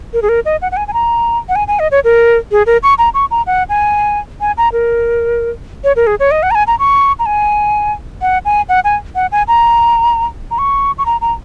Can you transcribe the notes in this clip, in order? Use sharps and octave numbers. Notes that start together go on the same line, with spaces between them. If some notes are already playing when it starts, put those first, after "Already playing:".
A#4
G#4
A#4
D#5
F#5
F#5
G#5
G#5
A#5
F#5
G#5
G#5
D#5
C#5
A#4
G#4
A#4
C#6
A#5
C#6
A#5
F#5
G#5
G#5
A#5
A#4
C#5
A#4
G#4
C#5
D#5
F#5
A#5
G#5
A#5
C#6
A#5
G#5
F#5
G#5
F#5
G#5
F#5
G#5
A#5
A#5
C#6
C#6
A#5
A#5